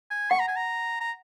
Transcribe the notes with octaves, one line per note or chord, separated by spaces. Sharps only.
G#5
F#5 C#6
A#5
G#5
A#5
A#5